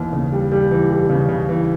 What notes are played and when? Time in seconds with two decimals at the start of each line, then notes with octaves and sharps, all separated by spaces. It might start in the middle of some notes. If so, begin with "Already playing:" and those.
Already playing: D#2 E3
0.13 C#3
0.32 G3
0.52 G3
0.71 E3
0.91 G3
1.09 C#3
1.29 C#3
1.49 E3